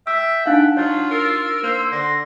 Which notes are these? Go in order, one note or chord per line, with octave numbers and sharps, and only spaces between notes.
E5 G5 E6
D4 D#4 F5 F#5 A5
F#3 F4 C#5
A#4 E6
A#3 C5
D3 C6 A#6